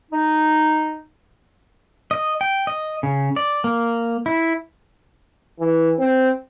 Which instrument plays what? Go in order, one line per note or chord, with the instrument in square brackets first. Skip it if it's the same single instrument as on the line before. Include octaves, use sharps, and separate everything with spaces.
[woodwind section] D#4
[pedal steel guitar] D#5
G5
D#5
C#3
D5
A#3
E4
[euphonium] E3
C4